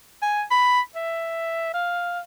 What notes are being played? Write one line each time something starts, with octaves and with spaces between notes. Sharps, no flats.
G#5
B5
E5
F5